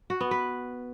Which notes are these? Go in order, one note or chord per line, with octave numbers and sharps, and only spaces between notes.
F#4
B3
B4